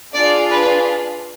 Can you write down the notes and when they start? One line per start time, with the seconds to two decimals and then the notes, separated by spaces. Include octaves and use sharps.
0.14 D4 F4 G#4 D5
0.50 B4